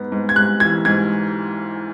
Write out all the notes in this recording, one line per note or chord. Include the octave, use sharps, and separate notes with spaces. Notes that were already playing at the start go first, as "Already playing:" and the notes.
Already playing: G#2 B3
G#2
G#6
G#2 F#6
E3 G#6
G#2 G#6